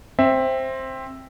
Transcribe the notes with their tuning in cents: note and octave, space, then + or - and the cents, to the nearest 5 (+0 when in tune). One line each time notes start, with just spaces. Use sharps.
C4 +10 E5 +0